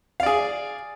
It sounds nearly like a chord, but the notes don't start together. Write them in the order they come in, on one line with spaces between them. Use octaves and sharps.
F5 D5 G#4